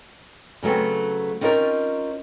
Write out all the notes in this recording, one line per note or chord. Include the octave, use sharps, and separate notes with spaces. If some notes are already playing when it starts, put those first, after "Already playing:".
C#3 F#3 A3 B3 C4
C4 C#4 D#4 F4 A#4 C#5